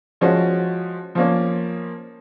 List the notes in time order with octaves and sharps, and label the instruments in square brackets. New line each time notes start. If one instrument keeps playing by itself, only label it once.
[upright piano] F3 G#3 C#4 F#4
F3 A#3 C#4